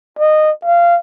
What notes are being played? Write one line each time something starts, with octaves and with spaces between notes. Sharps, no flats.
D#5
F5